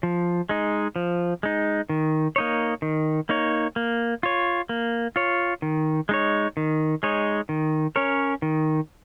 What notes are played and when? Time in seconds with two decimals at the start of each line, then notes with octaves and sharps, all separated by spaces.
0.03 F3
0.49 G#3 D#4
0.96 F3
1.43 G#3 D#4
1.89 D#3
2.36 A#3 D#4 C#5
2.82 D#3
3.29 A#3 D#4 C#5
3.76 A#3
4.23 F4 C#5
4.69 A#3
5.16 F4 C#5
5.62 D#3
6.09 G#3 D#4 C#5
6.57 D#3
7.03 G#3 D#4 C#5
7.49 D#3
7.96 C#4 A#4 C#5
8.42 D#3